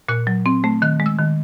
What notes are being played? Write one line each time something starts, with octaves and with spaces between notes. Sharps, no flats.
A#2 F#6
F#3
C4
A3
D#3 F#6
G#3
E6
D#3